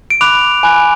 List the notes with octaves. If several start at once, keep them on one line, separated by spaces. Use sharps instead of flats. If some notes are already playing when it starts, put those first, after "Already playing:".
D7
B5 D6 F#6 F7
G#5 B5 F#6